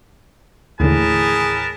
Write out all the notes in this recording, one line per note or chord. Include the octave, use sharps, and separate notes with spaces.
D#2 A2 D3 E3 G#4 A#4 B4 A5